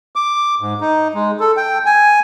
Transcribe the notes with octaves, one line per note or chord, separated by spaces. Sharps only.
D6
G#2
D#4
G#3
A4
G5
G#5